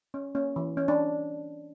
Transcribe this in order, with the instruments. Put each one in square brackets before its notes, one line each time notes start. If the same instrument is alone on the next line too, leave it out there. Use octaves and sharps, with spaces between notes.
[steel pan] C#4
A#3 C#4
E3
C#4
D4